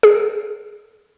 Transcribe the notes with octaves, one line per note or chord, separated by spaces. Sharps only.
G#4